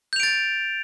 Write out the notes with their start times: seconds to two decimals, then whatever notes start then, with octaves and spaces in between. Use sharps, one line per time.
0.13 G6
0.16 F7
0.20 D7
0.23 A6